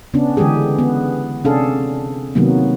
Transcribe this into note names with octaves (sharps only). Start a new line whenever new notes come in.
C#3 B3 C#4 D4
D3 E3 G#3 G4 G#4
B3
C3 C#4 D4 G#4 A4 F5
C3 D#3 F#3 A#3 B3